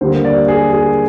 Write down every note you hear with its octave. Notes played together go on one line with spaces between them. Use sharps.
D#2 D3 G3 A#3 C5
D5
G#4
G#4